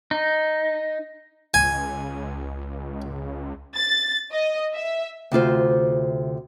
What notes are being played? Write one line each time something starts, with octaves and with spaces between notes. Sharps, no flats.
D#4
C#2 G#5
A6
D#5
E5
D2 C3 F4 C5